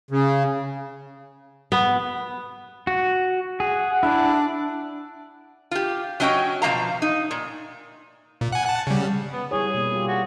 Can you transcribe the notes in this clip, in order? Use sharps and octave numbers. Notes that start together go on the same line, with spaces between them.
C#3
B3
F#4
G#4 F#5
D4 E4
F4 G4
F#3 C#4 D4 D#5 G5
B2 F3 A#3 F5 A#5
D#4
A#2
A#2
F#5 G#5
F#5 A5
C#3 G3
B3
G3 E4 G#4 C#5
B2 A#3
G3 F4 G4
F#4